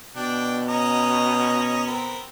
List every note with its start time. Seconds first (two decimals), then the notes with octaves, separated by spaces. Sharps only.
0.16 B2 D4 G5
0.69 C#4 D#5 A#5
1.87 B3 C4 A#4